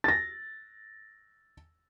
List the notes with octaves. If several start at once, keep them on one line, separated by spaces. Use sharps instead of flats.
A6 A#6